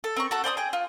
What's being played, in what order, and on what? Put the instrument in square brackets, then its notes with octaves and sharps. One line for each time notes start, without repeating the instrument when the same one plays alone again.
[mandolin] A4
C4 A#4 C#6
F#4 A4
C5 D5 A#5 D#6
G#4 G5
F4